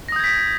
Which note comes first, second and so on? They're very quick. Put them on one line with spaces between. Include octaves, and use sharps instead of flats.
A#6 D#6 G6 G#6 B6